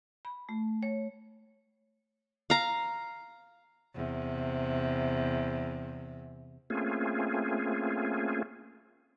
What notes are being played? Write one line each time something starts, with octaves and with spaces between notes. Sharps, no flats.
B5
A3
C#5
F5 A#5
E2 C3
A3 A#3 C4 C#4 F4 G#4